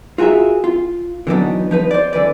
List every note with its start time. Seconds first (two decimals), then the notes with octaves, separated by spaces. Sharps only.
0.18 F4 F#4 G#4 A#4 E5
0.64 F4
1.27 D3 E3 F#3 B3 D4 D#4
1.71 F3 D#4 B4
1.91 C5 D5
2.13 D3 E3 B4 D5